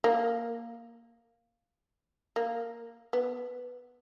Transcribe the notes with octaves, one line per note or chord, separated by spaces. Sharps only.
A#3
A#3
B3